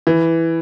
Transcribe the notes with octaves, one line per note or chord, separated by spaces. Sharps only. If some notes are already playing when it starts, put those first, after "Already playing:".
E3